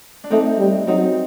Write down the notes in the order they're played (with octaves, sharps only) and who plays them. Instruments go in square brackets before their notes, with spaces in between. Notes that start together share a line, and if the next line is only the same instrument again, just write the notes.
[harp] D4
[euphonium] A3 [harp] C4 D#4
[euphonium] G3
[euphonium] F#3 [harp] C4 D#4